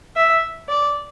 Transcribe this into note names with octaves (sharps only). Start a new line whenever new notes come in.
E5
D5